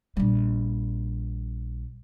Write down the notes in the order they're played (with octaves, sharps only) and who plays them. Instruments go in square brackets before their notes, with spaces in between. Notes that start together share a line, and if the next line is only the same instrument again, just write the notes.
[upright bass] A#1 G3